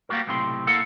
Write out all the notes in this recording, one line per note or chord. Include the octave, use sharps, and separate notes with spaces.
G3 A#3 B3 F#4 A#4
B1 A2 C3 C4 C6
A#3 E4 A4 F#5